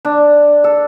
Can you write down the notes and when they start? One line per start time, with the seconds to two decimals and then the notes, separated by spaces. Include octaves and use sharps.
0.05 D4
0.64 A4